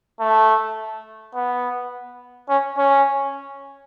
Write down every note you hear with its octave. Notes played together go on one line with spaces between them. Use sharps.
A3
B3
C#4
C#4